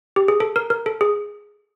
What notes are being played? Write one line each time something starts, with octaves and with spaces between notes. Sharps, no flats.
G4
G#4
A4
A#4
A#4
A4
G#4